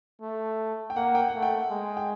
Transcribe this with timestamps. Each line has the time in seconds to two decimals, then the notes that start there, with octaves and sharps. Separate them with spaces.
0.21 A3
0.90 G5
0.96 A#3 F#5
1.15 G5
1.28 F#5
1.34 A3
1.42 G5
1.71 G#3
1.97 G5